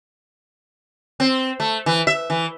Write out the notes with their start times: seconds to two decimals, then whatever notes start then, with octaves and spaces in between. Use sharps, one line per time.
1.20 C4
1.60 A3
1.86 E3
2.07 E5
2.30 E3